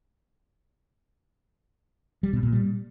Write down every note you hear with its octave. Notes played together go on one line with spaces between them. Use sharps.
G3
B2
A#2
G3